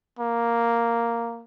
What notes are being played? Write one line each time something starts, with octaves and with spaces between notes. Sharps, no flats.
A#3